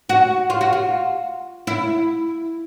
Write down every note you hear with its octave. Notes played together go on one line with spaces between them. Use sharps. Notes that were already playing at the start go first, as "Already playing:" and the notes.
F#4
F4
F#4
F4
E4